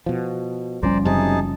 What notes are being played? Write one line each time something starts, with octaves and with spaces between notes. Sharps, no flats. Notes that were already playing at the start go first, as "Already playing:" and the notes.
B2 F3
F#1 F3 G3 C4 C#4 C5 D5 A#5
F#2 C3 D#4 G#4 A5